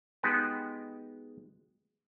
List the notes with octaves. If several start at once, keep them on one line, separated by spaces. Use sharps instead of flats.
G#3 B3 D#4 F#4 G4 B4